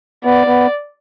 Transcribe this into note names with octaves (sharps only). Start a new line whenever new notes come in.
B3 D5
B3